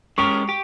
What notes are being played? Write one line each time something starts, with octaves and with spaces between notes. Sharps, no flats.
G#3 C#4 G4 A#4 C#6
G4